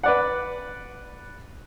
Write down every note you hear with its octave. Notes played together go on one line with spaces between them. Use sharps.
B4 D5 F#5